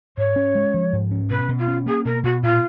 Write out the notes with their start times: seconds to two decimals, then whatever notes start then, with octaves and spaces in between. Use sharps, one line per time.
0.17 G#2 C#5
0.36 C#4
0.55 G#3
0.74 F3
0.93 G#2
1.11 C#4
1.30 B2 B4
1.49 B2
1.58 F4
1.68 C#4
1.86 A#3 G#4
2.05 B2 A#4
2.23 B2 F#4
2.43 A#2 F4